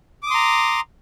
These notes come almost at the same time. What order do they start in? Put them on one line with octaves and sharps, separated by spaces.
D6 D#6 C6 A#5